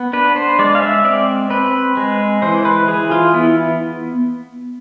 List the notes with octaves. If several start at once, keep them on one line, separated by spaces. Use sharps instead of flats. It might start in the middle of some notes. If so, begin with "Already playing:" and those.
Already playing: B3
D4 B4
C5
G#3 D5
F5
E5
C4 D5
C4 B4
G#3
E3 C5
B4
E3 G#4
F4
B3 E4